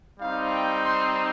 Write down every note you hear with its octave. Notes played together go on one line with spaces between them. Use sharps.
G3 C4 D#4 F5
G5
C6